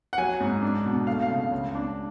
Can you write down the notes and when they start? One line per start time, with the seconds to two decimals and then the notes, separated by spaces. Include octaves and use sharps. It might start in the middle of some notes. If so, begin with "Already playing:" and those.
0.13 F#5
0.18 F#3 G#5
0.40 G#2
0.62 D4
0.85 B2
1.07 A3 F5
1.22 F5
1.30 C#3
1.51 C#2
1.75 D4